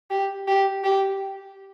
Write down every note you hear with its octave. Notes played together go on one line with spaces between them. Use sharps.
G4
G4
G4